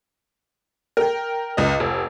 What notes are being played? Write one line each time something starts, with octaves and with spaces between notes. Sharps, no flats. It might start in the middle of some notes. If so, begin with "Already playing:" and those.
A#4 G5
C#2 D#5
F1